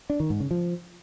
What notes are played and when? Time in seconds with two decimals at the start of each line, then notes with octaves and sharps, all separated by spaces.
0.10 D4
0.20 D#3
0.30 G#2
0.40 C#3
0.51 F3